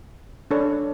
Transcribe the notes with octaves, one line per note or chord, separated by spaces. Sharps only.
D4 A4 C#5